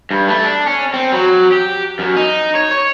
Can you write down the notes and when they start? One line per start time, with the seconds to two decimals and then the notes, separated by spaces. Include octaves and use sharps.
0.11 G2
0.28 A3
0.44 D4
0.67 C#4
0.94 C4
1.12 F#3
1.52 G4
1.99 F#2
2.16 D#4
2.55 C#5
2.71 C#5